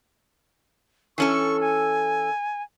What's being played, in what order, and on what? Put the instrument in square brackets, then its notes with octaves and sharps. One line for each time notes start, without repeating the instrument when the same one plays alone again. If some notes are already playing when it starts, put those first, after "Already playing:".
[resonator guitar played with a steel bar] E3 C#4 A4 [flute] C#6
[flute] G#5